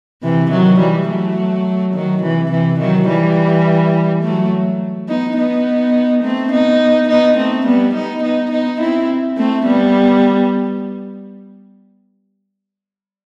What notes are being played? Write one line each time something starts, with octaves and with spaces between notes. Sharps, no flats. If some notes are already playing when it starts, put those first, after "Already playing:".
C3 E3
D#3 F#3
E3 G3
F#3 A3
D#3 F#3
C3 E3
C3 E3
D#3 F#3
E3 G3
F#3 A3
B3 D#4
B3 D#4
A3 C4
B3 D#4
B3 D#4
A3 C4
G3 B3
B3 D#4
B3 D#4
B3 D#4
C4 E4
A3 C4
G3 B3